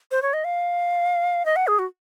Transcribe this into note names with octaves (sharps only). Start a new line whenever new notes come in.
C5
C#5
D#5
F5
D#5
F#5
G#4
F#4